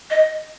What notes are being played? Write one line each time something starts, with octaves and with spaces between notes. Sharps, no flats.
D#5